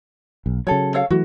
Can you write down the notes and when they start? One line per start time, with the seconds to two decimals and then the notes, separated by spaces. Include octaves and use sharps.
0.46 B1
0.67 C#3 F#3 A4 C#5
0.94 A4 C#5 F5
1.10 E3 F#3 A3 F#4